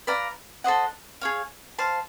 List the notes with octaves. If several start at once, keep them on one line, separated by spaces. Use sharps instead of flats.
B4 D5 F5 A#5
A4 C5 D#5 F#5
G#4 C#5 F5
C5 F5 A5